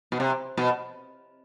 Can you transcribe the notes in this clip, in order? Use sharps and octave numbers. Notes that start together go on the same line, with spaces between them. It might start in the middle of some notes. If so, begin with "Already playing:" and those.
B2
C3
B2